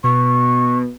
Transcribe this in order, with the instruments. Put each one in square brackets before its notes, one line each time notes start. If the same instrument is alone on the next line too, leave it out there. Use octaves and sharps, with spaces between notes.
[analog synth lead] B2 [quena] C#6